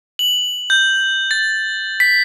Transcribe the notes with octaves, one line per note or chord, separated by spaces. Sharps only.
F#7
G6
A6
B6